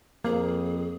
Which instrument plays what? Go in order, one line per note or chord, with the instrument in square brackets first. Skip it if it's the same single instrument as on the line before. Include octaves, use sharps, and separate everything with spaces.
[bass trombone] F2 [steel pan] A#3 [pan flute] G#4